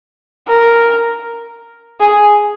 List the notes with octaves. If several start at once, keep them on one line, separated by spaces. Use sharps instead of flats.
A#4
G#4